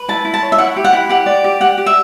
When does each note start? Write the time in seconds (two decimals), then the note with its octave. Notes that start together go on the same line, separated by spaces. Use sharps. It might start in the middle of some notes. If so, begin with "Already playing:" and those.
Already playing: B4
0.08 E4 A5
0.25 E4
0.34 A5
0.43 C#5
0.52 E5
0.58 E4 F#5
0.76 G4
0.85 F#5
0.93 E4
1.09 G4 F#5
1.26 D5
1.44 G4
1.60 G4 F#5
1.78 G4
1.86 E5